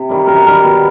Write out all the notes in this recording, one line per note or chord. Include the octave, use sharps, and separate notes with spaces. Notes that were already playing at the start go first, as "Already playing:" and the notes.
Already playing: C3
D#3 G3
F#2 A#4
D#3 G3 A#4
B2